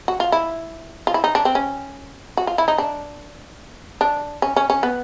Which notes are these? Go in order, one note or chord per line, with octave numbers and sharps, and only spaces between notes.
F#4
F4
E4
F4
E4
D#4
D4
C4
C#4
F#4
F4
E4
D#4
D4
D4
C#4
C#4
C#4
B3